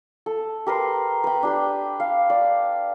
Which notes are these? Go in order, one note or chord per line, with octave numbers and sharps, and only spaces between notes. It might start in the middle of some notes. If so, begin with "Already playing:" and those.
A4
G4 A#4 B4 C6
B4 G5
D4 G4 B4
F5
D5